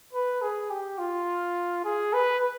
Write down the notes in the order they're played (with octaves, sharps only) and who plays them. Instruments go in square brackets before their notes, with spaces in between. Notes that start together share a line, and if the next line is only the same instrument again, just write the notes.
[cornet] B4
G#4
G4
F4
G#4
B4